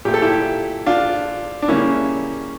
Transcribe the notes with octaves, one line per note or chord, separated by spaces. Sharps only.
A#2 A3 G4
A4
E4 G4
D4 F4
D4
C#3 G3 A#3 C#4 E4